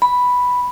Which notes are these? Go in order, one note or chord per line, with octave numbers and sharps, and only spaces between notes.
B5